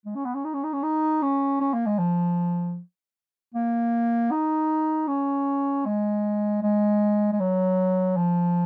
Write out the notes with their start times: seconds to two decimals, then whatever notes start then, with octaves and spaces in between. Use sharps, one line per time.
0.06 G#3
0.16 C#4
0.25 B3
0.35 C#4
0.45 D#4
0.54 C#4
0.64 D#4
0.73 C#4
0.83 D#4
1.22 C#4
1.61 C#4
1.74 A#3
1.86 G#3
1.99 F3
3.54 A#3
4.31 D#4
5.08 C#4
5.86 G#3
6.63 G#3
7.33 G#3
7.40 F#3
8.17 F3